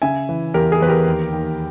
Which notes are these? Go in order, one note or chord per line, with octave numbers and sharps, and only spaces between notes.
C#3 E5 G#5
E3
E2 G4 A#4
G#4
E2 B4
G4 A#4
D#2
D#2